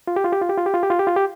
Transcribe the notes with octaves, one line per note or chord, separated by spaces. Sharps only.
F4
G4
F4
G4
F4
G4
F4
G4
F4
G4
F4
G4
F4
G4